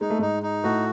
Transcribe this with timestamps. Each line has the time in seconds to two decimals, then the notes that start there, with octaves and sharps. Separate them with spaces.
0.01 G#3 D#4
0.10 A3
0.19 G#2 G#3 D#4
0.43 D#4
0.64 A2 A3 F#4